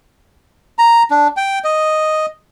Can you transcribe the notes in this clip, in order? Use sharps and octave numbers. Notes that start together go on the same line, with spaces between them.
A#5
D4
G5
D#5